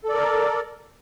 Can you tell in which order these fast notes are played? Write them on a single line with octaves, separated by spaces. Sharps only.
A4 D5 A#4